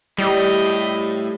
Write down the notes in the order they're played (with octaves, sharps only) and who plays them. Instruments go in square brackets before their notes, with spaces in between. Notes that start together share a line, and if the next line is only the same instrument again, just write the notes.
[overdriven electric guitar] A2 [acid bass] G3 [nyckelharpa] G4 D#5